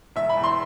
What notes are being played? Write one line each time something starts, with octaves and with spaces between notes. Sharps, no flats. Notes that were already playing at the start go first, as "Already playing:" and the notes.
E1 E5
B5
E2
C6